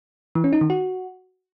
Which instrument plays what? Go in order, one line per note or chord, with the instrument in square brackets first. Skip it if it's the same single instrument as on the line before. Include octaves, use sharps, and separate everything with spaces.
[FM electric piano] E3
C#4
D#4
D#3
F#4